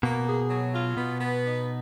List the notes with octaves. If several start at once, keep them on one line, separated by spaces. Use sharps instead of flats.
B2 A#3
G#4
F#3
F4
B2 B3
B3
D#4